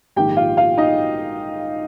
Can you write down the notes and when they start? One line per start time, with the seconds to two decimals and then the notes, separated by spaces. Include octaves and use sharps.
0.16 A#1 G#2 D#3 G4 G5
0.37 F4 F5
0.57 F4 F5
0.78 D#4 D#5